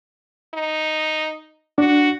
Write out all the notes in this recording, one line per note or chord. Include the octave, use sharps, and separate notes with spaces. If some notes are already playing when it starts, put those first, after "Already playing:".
D#4
D4 F#4